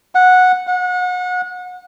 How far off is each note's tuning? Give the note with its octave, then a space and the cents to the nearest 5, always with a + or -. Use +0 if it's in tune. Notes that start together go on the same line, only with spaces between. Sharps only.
F#5 -10
F#5 -30